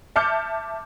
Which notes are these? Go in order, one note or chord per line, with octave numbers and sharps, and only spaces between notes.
E5 A5 D6 F6 G6 C#7